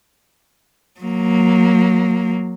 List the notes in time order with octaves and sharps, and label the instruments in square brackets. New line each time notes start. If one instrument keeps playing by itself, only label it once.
[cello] F#3 A#3